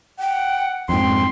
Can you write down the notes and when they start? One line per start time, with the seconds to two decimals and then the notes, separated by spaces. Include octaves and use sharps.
0.20 F#5 G5
0.89 F2 G#2 G5 C6